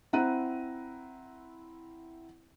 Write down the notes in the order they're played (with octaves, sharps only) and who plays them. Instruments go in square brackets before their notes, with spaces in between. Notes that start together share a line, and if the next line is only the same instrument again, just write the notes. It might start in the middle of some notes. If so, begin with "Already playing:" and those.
[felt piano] C4 E4 F#5 A#5 F#6 D#7